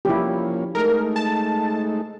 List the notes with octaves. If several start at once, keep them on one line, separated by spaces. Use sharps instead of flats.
F3 A#3 C#4 E4 G4
G#3 A3 D#4 A#4
A5